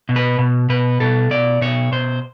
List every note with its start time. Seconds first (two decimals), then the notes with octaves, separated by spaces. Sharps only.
0.09 B2
0.16 B4
0.39 B2
0.69 B2 B4
1.00 B2 A4
1.31 B2 D5
1.61 B2 C#5
1.92 B2 C5